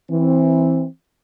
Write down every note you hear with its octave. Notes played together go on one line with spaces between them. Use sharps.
E3 C4